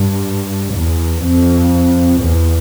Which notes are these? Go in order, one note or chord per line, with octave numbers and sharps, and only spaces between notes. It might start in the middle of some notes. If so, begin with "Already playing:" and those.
Already playing: G2
E2
F2
E2